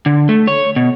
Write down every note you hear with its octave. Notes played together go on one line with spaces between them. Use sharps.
D3
A3
C#5
B2